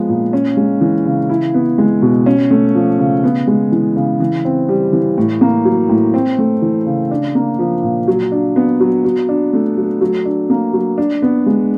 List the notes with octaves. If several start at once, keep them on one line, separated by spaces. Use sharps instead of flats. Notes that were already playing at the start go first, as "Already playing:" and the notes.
Already playing: F3 G#3 B3
A#2
C#4
G#3
E3
C#3
E4
B3
G#3
B2
C#4
A3
F3
C#3
B3
G#3
E3
C#3
E3
C4
G3
E3
A2
A#3
F#3
A2
C4
A3
E3
C#3
D4
A#3
F3
A#2
F#3
D4
B3
F#3
F#3
D4
A3
F#3
F#3
D4
A#3
F#3
D4
B3
G#3